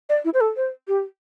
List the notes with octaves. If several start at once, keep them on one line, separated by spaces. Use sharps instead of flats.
D5
E4
C5
A4
C5
G4